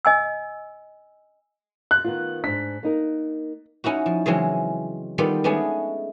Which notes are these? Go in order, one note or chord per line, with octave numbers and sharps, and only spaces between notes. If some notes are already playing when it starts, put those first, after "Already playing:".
D#5 G#5 E6
F#6
D#3 B3 F4
G#2 D4 B6
A#3 D#4 A#4
C#4 D#4 E4 F#4
F3
C#3 E3 F#3 G#3 C4 C#4
D#3 G3 B3 F4 G4 A4
G#3 A3 B3 C#4 D4 G#4